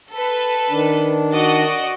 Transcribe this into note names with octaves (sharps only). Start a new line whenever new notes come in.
A4 B4
D#3 D4
F#4 D5 D#5